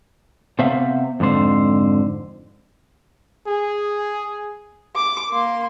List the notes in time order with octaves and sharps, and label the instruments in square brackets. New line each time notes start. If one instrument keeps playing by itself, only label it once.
[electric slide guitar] C3 B3 C5 E5 F5
F2 G#2 D3 C5
[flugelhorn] G#4
[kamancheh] D6
A#3 C6